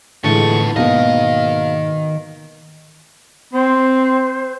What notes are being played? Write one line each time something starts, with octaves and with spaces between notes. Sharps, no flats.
A2 D3 E3 F3 G#3 B3 A5 C#6
G#2 B2 D#3 A#3 B3 D#4 D#5 F5
C4 C5